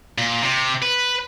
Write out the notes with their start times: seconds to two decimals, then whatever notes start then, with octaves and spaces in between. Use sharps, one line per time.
0.18 A#2
0.42 C3
0.82 B4